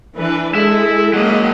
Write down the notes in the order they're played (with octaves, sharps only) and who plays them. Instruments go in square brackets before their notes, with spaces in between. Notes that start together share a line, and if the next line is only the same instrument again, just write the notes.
[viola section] E3 D4 B4
[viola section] G#3 A4 [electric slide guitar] E4 E5
[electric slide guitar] F#3 A#3 [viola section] G#3 D#5